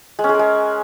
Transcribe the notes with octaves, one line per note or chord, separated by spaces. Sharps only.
G#3
C#4
G#3
A#4
G#3